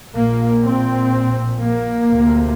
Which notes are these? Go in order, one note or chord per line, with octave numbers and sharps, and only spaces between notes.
A#1 A#2 A#3
C4
A#3
D2 C3